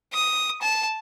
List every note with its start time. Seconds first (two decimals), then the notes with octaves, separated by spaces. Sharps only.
0.13 D#6
0.62 A5